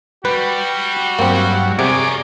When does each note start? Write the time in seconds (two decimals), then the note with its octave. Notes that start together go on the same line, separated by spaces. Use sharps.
0.25 G3 F#4 B4
1.19 G2 F#3 A#3 C4
1.79 C3 G#4 A#4 C#5 D5 D6